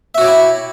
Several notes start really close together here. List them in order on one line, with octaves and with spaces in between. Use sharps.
E5 F#4 C#5 G4 E4